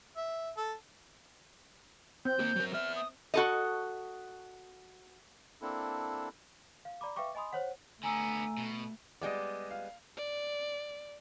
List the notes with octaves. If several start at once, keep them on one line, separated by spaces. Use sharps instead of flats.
E5
A4
C4 G6
A#3 G4
F#3 A#4
B3 E5 F6
D#6
F#4 A4 D#5
A#3 C4 D4 E4 A4
F5
D5 A#5 B5 D6
B4 E5 F5 G5 C#6 D6
D#5 G#5 B5 C6 D#6
C5 C#5 F#5
D3 A3 B3 G#5 A#5 E6
B2
G3 G#3 B3 D5 D#5
F5
D5